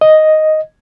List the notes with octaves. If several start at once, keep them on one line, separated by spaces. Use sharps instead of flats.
D#5